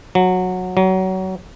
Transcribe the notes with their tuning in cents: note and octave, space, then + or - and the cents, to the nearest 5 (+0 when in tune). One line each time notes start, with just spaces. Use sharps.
F#3 -15
F#3 +25